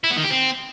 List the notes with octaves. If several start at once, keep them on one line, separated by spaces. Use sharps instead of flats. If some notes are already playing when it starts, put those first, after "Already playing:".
E4
B3
D#3
G4
C4